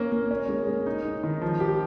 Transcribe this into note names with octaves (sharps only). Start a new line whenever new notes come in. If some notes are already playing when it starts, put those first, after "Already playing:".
Already playing: A#3 C#4
A#3
C#4
G#3
G#3
D#4
D#4
D#3
F3
G4